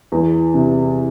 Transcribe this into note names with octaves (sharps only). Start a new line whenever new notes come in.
E2
C3